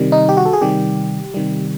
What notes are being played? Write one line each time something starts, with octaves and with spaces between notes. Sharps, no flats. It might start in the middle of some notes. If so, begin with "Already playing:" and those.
Already playing: C3 D#3 G3
D#4
G4
F#4
A4
G#4
C3 D#3 G3 G4
C3 D#3 G3